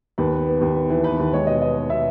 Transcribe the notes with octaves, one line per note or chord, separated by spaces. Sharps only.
D#2 B4
B3
B3
D#2
B3
E3
B3 B4
D#2
G#3 C#5
B2 D#5
B3 D#5
B3
B2 E5